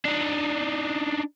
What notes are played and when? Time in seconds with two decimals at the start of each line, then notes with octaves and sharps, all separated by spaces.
0.05 D4 D#4